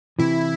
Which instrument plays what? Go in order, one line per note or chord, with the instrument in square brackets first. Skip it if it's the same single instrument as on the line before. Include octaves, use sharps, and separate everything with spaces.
[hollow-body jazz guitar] C3 E3 [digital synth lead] E4